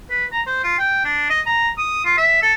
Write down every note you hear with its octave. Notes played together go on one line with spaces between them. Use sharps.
B4
A#5
C5
F4
G5
D4
D#5
A#5
D#6
F4
E5
A4